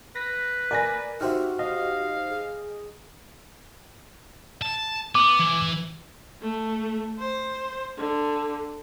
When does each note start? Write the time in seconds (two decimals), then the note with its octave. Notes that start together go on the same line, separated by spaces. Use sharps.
0.16 B4 A#6 B6
0.71 A#4 D5 G#5 A#6
1.21 D#4 F#4 G4 C5 E5 F6
1.59 D#5 F5
2.29 G#4
4.62 A5
5.15 B3 D6
5.39 E3
6.42 A3
7.19 C5
7.98 D3